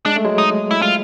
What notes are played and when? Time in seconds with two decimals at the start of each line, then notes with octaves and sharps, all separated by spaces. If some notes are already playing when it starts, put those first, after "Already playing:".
0.06 G#3 D4
0.16 A3
0.25 F#3 G#3
0.38 D#4
0.71 E4
0.82 F4